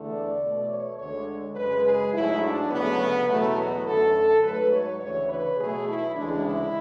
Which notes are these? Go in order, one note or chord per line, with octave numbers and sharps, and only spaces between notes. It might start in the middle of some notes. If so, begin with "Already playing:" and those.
Already playing: E2 D3 A3
D5
B2 A3
C#5
D2 D3 G#3 C#5
F#2 C#3 G#3 B4
G#4
G#2 F#3 A3 E4
D4
D2 C#3 F#3 A3 B3
E2 B2 F#3 A3
B3
F#2 D3 A3 A4
G#2 F#3 A3 B4
C#5
D2 C#3 E3 C#5
B4
B2 F#3 A3 G#4
E4
D2 C#3 E3 G#3 D4
E4